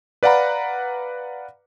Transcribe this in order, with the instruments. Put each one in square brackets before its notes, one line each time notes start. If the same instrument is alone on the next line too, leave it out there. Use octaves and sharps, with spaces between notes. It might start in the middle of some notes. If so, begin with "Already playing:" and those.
[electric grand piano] B4 D5 F5 F#5 A#5 B5